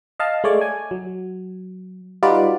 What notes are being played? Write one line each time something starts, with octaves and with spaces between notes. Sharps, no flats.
D#5 F5 A5
G#3 A3 C#5 D5
G#5
F#3
G3 D#4 F4 F#4 B4 D5